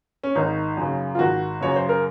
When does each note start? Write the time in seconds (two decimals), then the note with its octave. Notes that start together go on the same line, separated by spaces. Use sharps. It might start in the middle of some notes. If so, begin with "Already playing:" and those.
0.23 C#4
0.35 G#1 D#4
0.77 F#2 C#3
1.15 F4
1.19 G#1 F#4
1.61 F#2 C#3 C#5
1.76 C5
1.89 A#4